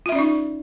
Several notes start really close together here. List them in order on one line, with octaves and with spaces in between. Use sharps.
F4 E5 C#4 D5 D#4